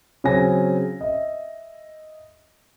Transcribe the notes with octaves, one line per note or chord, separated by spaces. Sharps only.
C#3 F#3 C4 C#4 G#5 A#6
D#5 E5